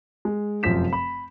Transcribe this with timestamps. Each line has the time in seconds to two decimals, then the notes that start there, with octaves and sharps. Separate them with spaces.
0.25 G#3
0.63 F1 F#2 F3 C5 B6 E7
0.93 B5